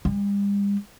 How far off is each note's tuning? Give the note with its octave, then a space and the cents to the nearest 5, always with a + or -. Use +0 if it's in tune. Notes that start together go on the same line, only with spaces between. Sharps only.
G3 +45